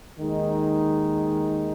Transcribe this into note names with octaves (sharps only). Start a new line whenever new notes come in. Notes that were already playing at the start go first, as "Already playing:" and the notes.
D#2 D#3 G#3 D#4